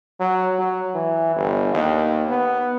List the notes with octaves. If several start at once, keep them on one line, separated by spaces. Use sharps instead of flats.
F#3
F#3
E3
G1
D#2
B3